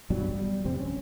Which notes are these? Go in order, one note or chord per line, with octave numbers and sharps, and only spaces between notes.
G2 B2 F#3 G3
G3
A1 F2 C3 C4
C#4